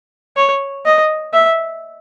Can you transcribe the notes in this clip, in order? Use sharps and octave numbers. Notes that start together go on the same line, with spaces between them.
C#5
D#5
E5